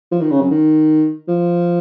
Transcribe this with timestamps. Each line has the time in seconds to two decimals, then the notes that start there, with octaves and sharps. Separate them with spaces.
0.11 F3
0.21 D#3
0.31 C#3
0.40 F#2
0.51 D#3
1.28 F3